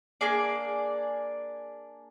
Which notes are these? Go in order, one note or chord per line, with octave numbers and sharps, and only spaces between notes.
A#3 D4 G#4 D5